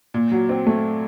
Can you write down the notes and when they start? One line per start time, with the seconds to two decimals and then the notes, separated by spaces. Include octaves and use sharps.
0.14 A#2
0.32 F#3
0.49 C4
0.67 A3